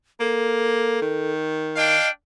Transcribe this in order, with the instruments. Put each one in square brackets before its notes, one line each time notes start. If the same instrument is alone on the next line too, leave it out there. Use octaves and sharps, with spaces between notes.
[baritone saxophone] A#3 [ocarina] A4
[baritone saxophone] D#3
[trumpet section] D4 F5 G5 [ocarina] D#5